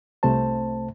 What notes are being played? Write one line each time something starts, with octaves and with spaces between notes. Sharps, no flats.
C2 C3 A3 C5 A5